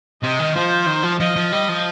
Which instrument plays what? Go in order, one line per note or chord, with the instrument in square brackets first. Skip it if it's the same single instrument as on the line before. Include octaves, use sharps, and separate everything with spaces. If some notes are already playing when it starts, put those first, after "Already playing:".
[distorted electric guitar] C3 [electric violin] D#5
[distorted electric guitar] D#3
[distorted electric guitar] F3 [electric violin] C5
[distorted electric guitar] D#3
F3
[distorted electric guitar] F3 [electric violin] D#5
[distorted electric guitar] F3
[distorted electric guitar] G3 [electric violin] D#5
[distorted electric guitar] F3